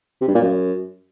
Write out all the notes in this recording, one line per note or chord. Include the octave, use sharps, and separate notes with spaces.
C3
G2
A#2
F#2